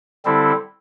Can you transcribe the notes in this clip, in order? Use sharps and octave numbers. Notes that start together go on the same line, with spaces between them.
D3 G3 C4 E4 A4